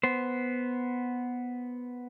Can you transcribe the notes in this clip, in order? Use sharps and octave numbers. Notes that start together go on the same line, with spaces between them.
B3 C5